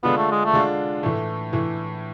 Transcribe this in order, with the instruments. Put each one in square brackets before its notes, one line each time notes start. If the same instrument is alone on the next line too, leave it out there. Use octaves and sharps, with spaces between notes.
[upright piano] D3 G#3 D4 F4 [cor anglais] B3
[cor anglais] A3
G#3
A3
[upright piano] D3 G#3 D4 F4
A2 E3 A3
A2 E3 A3